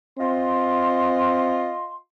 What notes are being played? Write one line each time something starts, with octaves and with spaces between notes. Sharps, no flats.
C4 F4 D#5 C6